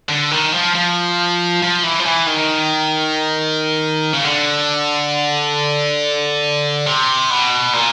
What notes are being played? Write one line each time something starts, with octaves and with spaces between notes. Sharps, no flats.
D3
D#3
F3
F3
F3
E3
F3
E3
D#3
C#3
D3
C3
B2
A#2